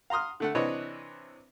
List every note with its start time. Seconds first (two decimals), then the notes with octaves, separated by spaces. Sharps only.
0.10 F5 A#5 C6 D#6 F6
0.40 D3 A3 F#5
0.55 C3 E3 D4 B4 C#5 D#5